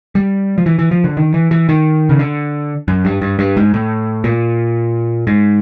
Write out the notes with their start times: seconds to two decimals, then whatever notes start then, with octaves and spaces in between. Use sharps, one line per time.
0.15 G3
0.58 F3
0.66 E3
0.79 E3
0.91 F3
1.04 D3
1.17 D#3
1.34 E3
1.51 E3
1.69 D#3
2.09 C#3
2.19 D3
2.88 F#2
3.05 G2
3.22 G2
3.39 G2
3.57 G#2
3.74 A2
4.24 A#2
5.27 G#2